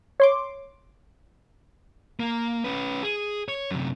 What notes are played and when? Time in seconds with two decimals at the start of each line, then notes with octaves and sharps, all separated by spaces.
0.20 C#5 C6 D6
2.20 A#3
2.65 C#4 B4
3.03 G#4
3.48 C#5
3.71 F#2 C3